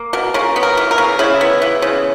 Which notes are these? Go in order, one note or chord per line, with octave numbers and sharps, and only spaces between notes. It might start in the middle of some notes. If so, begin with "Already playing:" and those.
Already playing: A#3
B2 A#4
C#3 A#4
B3
A#4
E3
A#4
C#3
C#3 E4
B3
E3
C#3